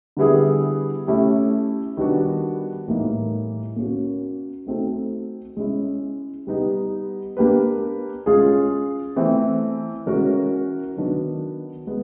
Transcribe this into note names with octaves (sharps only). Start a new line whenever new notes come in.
D3 G3 B3 E4 G#4
A3 C#4 E4 G4
D#3 G3 B3 D4 F#4
A2 E3 G3 A#3 D#4
A#3 C#4 F#4
A3 C4 D#4 F#4 A4
G#3 C#4 E4
G3 B3 D#4 G4
A#3 D4 G4 B4
G#3 C#4 F4 G#4
E3 A3 C4
E3 G#3 C#4 F#4 A#4
D#3 F#3 B3 D4 F#4
G#3 B3